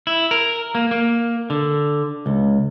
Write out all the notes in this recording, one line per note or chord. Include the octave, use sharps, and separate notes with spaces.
E4
A#4
A#3
A#3
D3
C#2